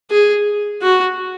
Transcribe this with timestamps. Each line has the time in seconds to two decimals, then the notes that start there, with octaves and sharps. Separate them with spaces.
0.10 G#4
0.81 F#4